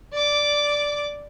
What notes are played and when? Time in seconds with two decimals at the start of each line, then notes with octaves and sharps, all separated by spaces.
0.12 D5 D6